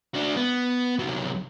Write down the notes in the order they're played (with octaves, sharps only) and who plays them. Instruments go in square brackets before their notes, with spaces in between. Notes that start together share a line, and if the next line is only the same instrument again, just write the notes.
[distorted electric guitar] D4 F#4
B3
C2 F#3